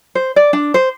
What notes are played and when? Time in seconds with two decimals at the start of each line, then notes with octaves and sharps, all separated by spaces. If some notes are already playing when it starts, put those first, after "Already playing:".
0.15 C5
0.36 D5
0.53 D4
0.74 C5